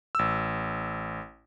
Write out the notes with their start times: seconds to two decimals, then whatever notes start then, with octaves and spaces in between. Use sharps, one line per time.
0.15 A1 E6